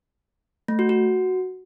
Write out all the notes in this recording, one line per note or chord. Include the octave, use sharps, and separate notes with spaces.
A3
F#4
F#4